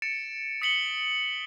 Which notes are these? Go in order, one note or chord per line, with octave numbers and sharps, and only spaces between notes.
A6 C#7 D7 E7
D#6 B6 C#7 F#7 G7